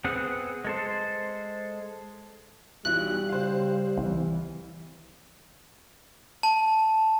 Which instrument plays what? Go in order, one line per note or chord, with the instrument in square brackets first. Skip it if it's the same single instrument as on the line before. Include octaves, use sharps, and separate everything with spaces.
[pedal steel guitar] B3 C4 G#4 F#5
G#3 A4 C5
[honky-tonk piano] B1 B2 E3 [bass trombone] G3 [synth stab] F#6
[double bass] C#3 [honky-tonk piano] C5 F5
[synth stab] C2 [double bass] E3
[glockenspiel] A5